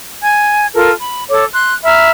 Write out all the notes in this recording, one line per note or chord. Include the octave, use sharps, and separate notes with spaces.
G#5 G#6
F4 A4 A#4
B5
A4 C#5 D6
C6 F#6
E5 A#5 B5 F6